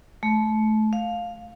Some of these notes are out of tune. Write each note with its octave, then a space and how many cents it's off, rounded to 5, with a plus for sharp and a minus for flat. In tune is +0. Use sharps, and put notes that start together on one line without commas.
A3 -25
F5 +10